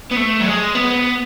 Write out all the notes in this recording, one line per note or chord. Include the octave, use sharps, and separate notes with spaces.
B3
A3
F#3
G#3
B3